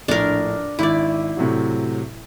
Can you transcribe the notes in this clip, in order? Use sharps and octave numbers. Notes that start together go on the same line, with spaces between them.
A#1 A2 D4 A#4
G#1 E4 D5
A2 C3 F#3